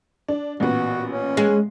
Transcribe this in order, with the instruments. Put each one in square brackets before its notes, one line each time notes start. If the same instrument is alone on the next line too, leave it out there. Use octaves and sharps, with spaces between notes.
[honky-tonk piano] D4
[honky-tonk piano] A1 A#2 B3 [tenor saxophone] F#4
[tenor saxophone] C#4
[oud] G#3